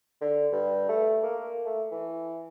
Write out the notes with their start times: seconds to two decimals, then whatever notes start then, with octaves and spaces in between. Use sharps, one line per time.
0.21 D3
0.52 G2
0.89 A3
1.23 A#3
1.66 A3
1.92 E3